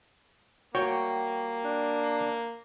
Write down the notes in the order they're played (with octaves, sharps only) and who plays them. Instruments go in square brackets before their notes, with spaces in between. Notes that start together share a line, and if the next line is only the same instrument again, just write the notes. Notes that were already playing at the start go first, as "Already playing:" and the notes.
[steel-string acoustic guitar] G3 G4 [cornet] A#3 [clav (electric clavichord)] F#4 C#5 G5
[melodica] D4